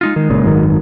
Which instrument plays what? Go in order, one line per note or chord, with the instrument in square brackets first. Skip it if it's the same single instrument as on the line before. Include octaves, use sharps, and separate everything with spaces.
[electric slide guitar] G#3 D#4 F4
[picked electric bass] D#3 [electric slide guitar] G#3
[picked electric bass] F#1 A#2 C#3
G#1 F#2 D#3